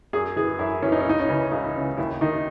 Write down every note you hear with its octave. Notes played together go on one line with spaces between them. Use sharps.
F#2 G#4
E3 G#4
F#2 E4
E3 C#4
D#4
C#4
C#2 D#4
C#4
C#3 E3
C#2 D#4
C#3 E3
D#2 E4
D#3 D#4